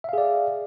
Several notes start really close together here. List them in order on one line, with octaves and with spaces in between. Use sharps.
E5 F5 G#4 D5